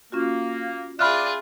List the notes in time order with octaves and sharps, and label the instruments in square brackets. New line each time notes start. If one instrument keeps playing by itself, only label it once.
[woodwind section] A#3 [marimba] C#4 F4 F#4
[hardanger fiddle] F4 G#4 [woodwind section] D5 [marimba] E5 [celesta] B5 F6 F#6